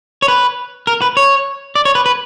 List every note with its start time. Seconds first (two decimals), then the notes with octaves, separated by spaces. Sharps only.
0.22 C#5
0.28 B4
0.87 A#4
1.02 B4
1.17 C#5
1.75 D5
1.85 C#5
1.95 B4
2.06 B4